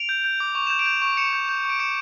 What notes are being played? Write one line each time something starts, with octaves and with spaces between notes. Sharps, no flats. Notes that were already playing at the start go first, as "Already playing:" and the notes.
Already playing: D7 F7
G6
G6
D6
C#6 F7
G6 E7
D7 F7
G6
C#6
C#6 C#7 E7
G6
G6
C#6
D7
D6 C#7 E7